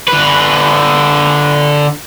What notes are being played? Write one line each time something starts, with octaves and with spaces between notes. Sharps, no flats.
D3 B4